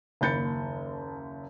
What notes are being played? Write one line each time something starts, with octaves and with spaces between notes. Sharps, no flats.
F#1 D#2 B5 G6 A6 C#7